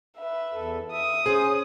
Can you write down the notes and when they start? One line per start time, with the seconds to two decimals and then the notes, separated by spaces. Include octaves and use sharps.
0.18 B4 E5
0.54 E2 A4
0.92 E5 D#6
1.26 C#4 G#4 C5